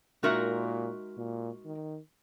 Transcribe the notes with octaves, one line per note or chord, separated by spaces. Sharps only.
A#2 G#3 D#4 F#4 A#4 E5
A#2
D#3